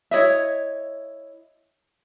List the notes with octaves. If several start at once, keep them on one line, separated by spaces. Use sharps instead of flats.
E4 C#5 D#5 E5